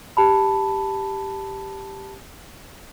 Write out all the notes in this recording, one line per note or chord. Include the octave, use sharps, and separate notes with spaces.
G4 A5 B5